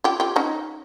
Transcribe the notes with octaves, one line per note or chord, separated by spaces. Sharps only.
F4 G4
F4 G4
C#4 D#4